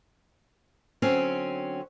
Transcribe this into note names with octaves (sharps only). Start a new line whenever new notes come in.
D3 F#3 C4 C#4